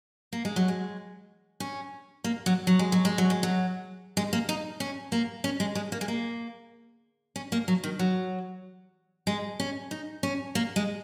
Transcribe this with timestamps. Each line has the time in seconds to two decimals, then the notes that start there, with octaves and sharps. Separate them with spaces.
0.33 A#3
0.45 G#3
0.56 F#3
0.68 G#3
1.60 C#4
2.24 A#3
2.46 F#3
2.67 F#3
2.79 G#3
2.92 F#3
3.05 G#3
3.18 F#3
3.30 G#3
3.43 F#3
4.17 G#3
4.33 A#3
4.49 D#4
4.80 C#4
5.12 A#3
5.44 C#4
5.60 G#3
5.75 G#3
5.92 A#3
6.01 G#3
6.08 A#3
7.36 C#4
7.52 A#3
7.68 F#3
7.84 D#3
7.99 F#3
9.27 G#3
9.60 C#4
9.91 D#4
10.23 C#4
10.55 A#3
10.76 G#3